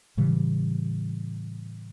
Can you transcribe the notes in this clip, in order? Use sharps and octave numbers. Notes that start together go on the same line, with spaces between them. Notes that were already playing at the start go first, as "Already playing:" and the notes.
A2 C#3 E3 G3